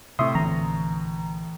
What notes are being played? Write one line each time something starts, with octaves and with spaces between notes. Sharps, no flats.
A2 C3 C4 E5 C6 C#6 D#6
A#1 D3 E3 C4 A#5